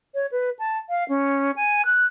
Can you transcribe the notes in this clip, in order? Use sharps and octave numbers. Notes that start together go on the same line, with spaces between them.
C#5
B4
A5
F5
C#4
G#5
F#6